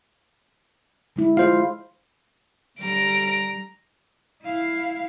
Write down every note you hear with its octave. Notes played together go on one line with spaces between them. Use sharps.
D3 G#3 E4
G#3 F4 C5 F5
D3 G3 A#5 D7
E4 F5